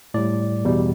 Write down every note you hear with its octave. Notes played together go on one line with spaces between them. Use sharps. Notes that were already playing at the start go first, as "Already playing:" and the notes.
A2 G3 D5
E2 B2 G3